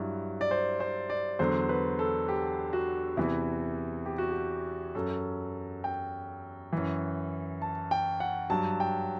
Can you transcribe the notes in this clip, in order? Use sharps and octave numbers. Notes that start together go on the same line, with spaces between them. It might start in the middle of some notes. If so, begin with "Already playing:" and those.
Already playing: G2 F#3 E4
D5
C5
C5
D5
E2 D3 F#3 C5
B4
A4
G4
F#4
E2 C3 E3 E4
G4
F#4
G4
F#2 F#3 A4
G5
F#2 E3
A5
G5
F#5
G2 F#3 A5
G5